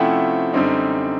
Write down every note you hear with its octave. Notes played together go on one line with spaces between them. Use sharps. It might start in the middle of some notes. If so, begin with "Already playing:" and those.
Already playing: C3 F3 A3 C#4 E4 F#5 G5
F#2 D3 G3 C4 D#4